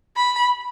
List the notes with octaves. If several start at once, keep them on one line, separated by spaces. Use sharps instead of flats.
B5